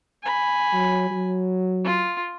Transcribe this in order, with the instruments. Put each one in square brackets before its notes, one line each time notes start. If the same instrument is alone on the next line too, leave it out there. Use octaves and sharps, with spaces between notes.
[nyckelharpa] G#5 B5
[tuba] F#3
F#3
[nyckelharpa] F4